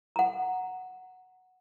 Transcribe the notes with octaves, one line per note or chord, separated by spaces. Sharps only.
F#5 A#5